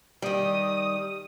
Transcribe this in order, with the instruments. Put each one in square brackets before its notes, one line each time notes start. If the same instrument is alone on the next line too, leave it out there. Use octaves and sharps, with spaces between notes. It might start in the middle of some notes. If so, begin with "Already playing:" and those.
[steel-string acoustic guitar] D#3 G3 [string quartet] D#6